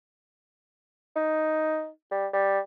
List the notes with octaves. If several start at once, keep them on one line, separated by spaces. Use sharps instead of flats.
D#4
G3
G3